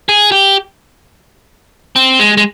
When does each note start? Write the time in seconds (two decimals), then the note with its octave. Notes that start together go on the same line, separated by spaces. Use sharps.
0.09 G#4
0.32 G4
1.96 C4
2.19 G#3
2.37 G#3